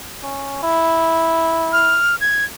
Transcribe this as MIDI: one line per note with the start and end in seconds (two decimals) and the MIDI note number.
0.23 0.60 61
0.63 2.02 64
1.73 2.15 89
2.21 2.44 92